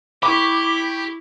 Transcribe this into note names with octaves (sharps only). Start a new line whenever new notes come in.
E4 G4 B5 C#6 D6